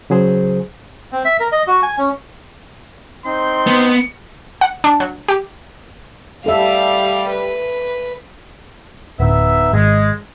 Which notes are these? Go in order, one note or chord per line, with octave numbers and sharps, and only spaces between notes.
C#3 F#3 G#4 C5
C4
E5
A#4
D#5
F#4
G#5
C#4
C4 D#4 C6
B3
F#5
D4
F#3
G4
G3 A4 E5 F5
B4
D1 B3 D#4 E5
G#1 G#3